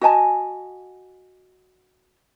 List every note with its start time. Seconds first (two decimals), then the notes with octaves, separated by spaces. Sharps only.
0.01 F#4 D#5 G#5 A5